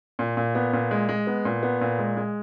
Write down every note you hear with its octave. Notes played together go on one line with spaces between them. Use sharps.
A#2
A#2
B3
A#2
G#3
G#3
B3
A#2
B3
A#2
G#3
G#3